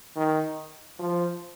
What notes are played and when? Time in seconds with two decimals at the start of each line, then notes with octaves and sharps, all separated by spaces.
0.16 D#3
0.99 F3